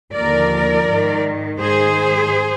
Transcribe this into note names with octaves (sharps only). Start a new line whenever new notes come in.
D#2 D3 F3 A#4 D5
G#2 D#3
G#2 D#3 G#4 C5